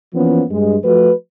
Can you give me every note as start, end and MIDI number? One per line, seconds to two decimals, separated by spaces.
0.14 0.43 52
0.14 0.43 53
0.14 0.43 58
0.14 0.43 59
0.14 0.43 61
0.50 0.77 43
0.50 0.77 56
0.85 1.11 53
0.85 1.11 57
0.85 1.11 66
0.85 1.11 71